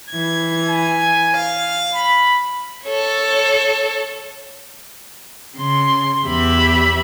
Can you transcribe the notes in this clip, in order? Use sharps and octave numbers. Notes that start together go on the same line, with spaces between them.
E3 G#6
G#5
F5
B5
A4 C#5
C#3 C6
E2 G4 E5 B5